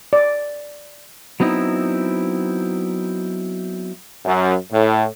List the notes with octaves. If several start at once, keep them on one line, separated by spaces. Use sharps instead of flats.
D5
F#3 B3 C4 D#4 E4
F#2
A2